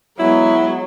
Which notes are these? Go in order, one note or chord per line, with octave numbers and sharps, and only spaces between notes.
F#3 G#3 B3 E4